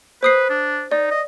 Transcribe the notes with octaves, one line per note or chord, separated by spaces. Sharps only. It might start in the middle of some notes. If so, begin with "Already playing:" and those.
B4 C5 D#6 C7
D4
D#4 D5
D#5